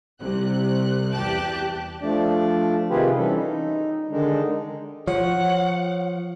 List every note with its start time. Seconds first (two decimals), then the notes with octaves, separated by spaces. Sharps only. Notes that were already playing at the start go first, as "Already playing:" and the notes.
0.21 C2 C3 F#6
1.11 E2 G4 G5 A5 F#6
2.01 F3 A3 D4 D5
2.90 C3 D#3 F4 G4 G#4 B4
3.16 E3 G3 C#4 A4
3.34 D#4
4.11 D3 D#3 G#3 D4 D#4
5.08 F3 C#5 F#5